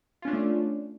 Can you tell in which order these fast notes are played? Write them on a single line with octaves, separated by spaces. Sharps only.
F4 C#4 D4 D5 A3